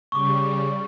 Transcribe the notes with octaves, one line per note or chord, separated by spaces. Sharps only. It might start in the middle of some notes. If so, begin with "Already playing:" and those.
C#3 G3 C#6 D6